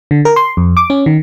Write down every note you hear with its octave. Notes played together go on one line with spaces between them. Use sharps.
D3
A#4
C6
F2
D6
C#4
D#3